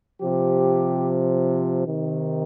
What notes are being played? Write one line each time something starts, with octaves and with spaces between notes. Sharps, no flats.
C3 F3 G4
C3 D#3